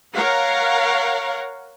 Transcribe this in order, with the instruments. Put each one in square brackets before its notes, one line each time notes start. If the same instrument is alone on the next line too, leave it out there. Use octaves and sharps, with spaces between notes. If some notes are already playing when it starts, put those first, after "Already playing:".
[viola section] A#4 C#5 F5 F#5